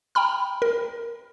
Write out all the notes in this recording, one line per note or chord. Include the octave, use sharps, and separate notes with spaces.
G5 A#5 B5 F6
A#4